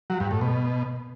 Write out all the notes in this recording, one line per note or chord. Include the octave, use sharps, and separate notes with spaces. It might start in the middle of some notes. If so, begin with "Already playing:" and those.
F#3
G2
A2
B2